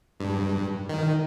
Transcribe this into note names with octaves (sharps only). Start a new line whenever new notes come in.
G2
D#3